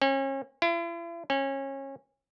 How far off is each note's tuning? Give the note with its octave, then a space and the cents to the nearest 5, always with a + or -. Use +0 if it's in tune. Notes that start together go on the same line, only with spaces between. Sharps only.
C#4 -35
E4 +45
C#4 -25